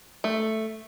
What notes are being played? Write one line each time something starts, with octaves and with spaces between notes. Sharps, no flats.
A3